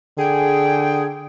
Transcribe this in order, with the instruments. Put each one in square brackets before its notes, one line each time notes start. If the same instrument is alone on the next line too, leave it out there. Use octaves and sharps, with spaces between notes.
[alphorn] D3 [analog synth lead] G#4 [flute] G5